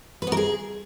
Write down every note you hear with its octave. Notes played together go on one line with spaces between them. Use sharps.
B4
B3
A#4
G#4